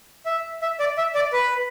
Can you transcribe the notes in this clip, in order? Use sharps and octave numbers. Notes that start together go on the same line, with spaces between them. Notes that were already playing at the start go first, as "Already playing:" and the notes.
E5
E5
D5
E5
D5
B4